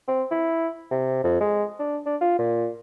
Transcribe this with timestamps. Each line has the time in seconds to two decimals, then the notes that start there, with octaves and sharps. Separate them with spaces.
0.08 C4
0.31 E4
0.91 C3
1.24 F2
1.41 G#3
1.79 D4
2.06 D4
2.21 F4
2.39 A#2